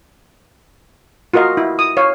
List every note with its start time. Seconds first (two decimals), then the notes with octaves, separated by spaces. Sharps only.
1.34 F4 F#4 A#4 D#5 F5
1.57 E4
1.79 D#6
1.97 C#5 F5